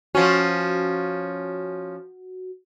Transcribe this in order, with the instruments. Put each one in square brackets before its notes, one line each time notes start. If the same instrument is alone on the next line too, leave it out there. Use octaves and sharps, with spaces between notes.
[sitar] F3 C#4 [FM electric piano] F#4